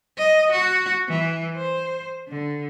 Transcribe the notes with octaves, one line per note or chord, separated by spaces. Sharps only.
D#5
F#4
E3
C5
D3